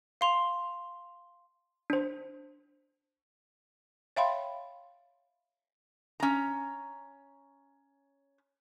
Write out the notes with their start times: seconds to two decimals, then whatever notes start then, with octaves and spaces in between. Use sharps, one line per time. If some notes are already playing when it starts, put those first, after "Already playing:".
0.21 F5 C6 F7
1.90 D4 C5
4.16 C#5 E5 F5 G5 B5 C6
6.20 C#4 A#5